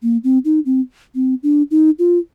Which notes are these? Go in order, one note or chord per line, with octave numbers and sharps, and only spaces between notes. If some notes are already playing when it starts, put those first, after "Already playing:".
A#3
C4
D#4
C4
C4
D4
D#4
F4